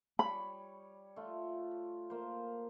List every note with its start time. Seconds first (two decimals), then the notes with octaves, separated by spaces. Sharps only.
0.19 G3 C#5 B5
1.16 A3 F4
2.10 A#3 C5